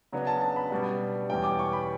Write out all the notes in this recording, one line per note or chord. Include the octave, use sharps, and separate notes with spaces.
C#3 F#3 B3 D4
A5
A5
B5
B2 G3 D4
E2 B2 G3 C#4 G5
D6
C#6
B5